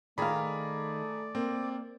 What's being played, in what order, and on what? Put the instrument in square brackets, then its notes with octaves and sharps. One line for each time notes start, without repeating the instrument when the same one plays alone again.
[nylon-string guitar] D#3 F5 [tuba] A3 [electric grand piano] G#4 A#5 B5 [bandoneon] D5
[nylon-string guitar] A#3 [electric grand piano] C4